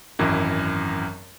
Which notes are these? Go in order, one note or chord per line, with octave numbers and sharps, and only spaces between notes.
G#1 F#2 E3